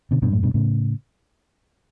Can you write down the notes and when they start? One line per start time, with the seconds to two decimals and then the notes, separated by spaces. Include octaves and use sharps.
0.11 B2 D3
0.22 G2 B2
0.32 F#2 A2
0.43 G2 B2
0.54 A2 C#3